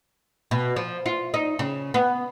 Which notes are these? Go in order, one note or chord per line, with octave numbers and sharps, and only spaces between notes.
B2
F3
F4
D#4
C#3
B3